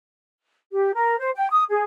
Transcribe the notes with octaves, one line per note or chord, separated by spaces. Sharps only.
G4
A#4
C5
G5
D#6
G#4